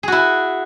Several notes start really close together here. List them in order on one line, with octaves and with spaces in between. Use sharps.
G#4 F#4 E4